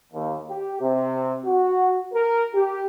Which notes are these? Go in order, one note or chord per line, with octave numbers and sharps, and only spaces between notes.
D#2
G4
C3
F#4
A#4
G4